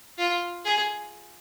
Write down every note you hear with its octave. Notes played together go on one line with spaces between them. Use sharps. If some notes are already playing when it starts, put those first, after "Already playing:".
F4
G#4